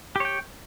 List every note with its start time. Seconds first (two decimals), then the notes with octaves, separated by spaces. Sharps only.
0.16 G4
0.20 C#5
0.25 G5